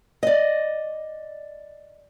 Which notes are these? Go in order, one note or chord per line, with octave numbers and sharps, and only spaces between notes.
D5 D#5